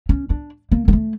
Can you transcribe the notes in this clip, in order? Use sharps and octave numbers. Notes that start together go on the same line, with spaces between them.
C#4
D4
A#3
A#3
A3